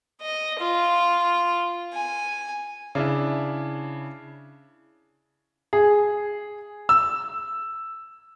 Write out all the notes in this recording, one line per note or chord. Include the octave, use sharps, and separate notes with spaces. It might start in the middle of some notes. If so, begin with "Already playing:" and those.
D#5
F4
G#5
C#3 D4 E4
G#4
E6